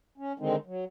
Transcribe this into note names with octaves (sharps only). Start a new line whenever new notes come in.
C#4
D3 D#3 G#3 C4 D#4
F#3